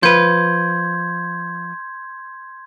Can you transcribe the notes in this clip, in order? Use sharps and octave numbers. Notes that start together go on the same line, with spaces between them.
F3 B4 C6 G6 G#6